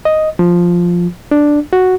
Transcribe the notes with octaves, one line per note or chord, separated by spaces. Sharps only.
D#5
F3
D4
F#4